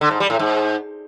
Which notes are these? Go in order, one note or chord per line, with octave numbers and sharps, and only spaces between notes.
D3
G#2
G3
A2
G#2